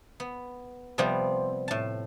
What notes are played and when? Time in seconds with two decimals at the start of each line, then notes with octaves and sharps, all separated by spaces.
0.20 B3
0.98 C3 F3 G3 B3 C4
1.68 A2 A5